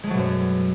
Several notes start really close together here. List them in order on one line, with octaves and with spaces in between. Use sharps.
G#3 A3 F#3 B2 F#2